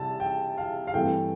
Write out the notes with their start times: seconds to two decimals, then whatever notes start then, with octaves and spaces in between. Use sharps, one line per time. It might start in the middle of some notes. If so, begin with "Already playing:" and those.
Already playing: C3 G3 A5
0.20 G5
0.58 F5
0.87 F5
0.94 G2 E3 A3 C4 G5